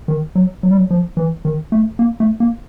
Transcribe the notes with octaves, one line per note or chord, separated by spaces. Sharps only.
D#3
F#3
F#3
G3
F#3
F3
E3
D#3
A3
A#3
A3
A#3